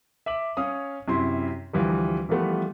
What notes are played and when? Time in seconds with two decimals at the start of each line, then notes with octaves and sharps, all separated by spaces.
0.26 E5 D6 F#7
0.57 C#4 C#5 F5 D#6
1.08 F#2 C3 E4 C6
1.73 D2 E3 F3 G3
2.29 E3 F3 G3 A3 B3